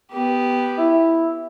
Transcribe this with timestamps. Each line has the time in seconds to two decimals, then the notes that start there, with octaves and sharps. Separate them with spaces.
0.11 B3 G4
0.78 E4